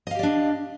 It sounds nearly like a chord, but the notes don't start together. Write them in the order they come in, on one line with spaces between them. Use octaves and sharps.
D#5 F5 G4 D5 D4